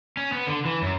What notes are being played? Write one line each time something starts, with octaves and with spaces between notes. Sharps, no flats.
C#4
B3
D3
E3
F#2